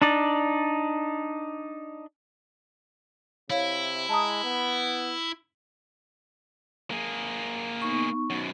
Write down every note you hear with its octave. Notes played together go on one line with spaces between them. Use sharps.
D4 D#4 D5
C3 E4 C#5 F5
G#3 A5 A#5 D#6
B3
A#3 G#4
B3 D#4 C#6
F#2 B2